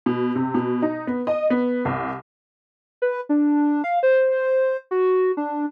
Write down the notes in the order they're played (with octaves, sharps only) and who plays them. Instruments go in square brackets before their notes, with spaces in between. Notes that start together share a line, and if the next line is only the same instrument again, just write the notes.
[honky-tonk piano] B2
C3
B2
D#4
B3
D#5
B3
C2
[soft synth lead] B4
D4
F5
C5
F#4
D4